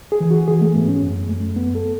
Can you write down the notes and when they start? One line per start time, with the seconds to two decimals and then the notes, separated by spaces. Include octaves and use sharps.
0.12 G#4
0.20 E3
0.31 F#4
0.48 E3 G#4
0.62 A3
0.75 G#2 B3
0.88 C#4
1.02 F#2
1.29 F#2 A3
1.56 F#2 B3
1.75 A4